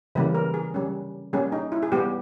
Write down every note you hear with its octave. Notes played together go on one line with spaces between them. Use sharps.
C#3 E3 G3 A#3 B4
A#4
G#4
G3 C#4
G3 A#3 C#4 G#4
D#4
E4
G#4
G3 B3 G4